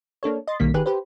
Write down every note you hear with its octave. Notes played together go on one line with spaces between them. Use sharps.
A#3 D4 A4 C#5
D#5 C6 A6
B1 D#3 G3 A#3 B6
G#1 D#3 G4 G#4 B4 F#6
G4 B4 C5